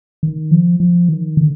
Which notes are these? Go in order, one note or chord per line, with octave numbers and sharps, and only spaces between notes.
D#3
F3
F3
D#3
D3